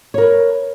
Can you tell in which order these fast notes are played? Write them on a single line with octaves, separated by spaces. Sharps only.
C#5 A#4 B4